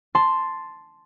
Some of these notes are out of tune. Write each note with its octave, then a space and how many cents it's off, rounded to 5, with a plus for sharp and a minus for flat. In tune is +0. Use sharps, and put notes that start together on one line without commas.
A5 +0 C6 +0